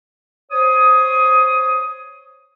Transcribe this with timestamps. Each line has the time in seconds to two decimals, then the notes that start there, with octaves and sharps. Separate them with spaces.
0.51 C5 C#5 D#6